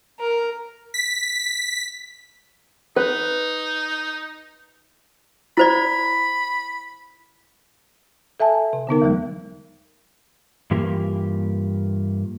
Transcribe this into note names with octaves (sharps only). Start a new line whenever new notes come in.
A#4
B6
D#4 B4
E4 C5 D5 B5
A4 E5 G#5 A5
C3
D3 B3 D#4 A#4
E2 E3 F#3 G#3
G2 E3 A#3 F4 G4 A#4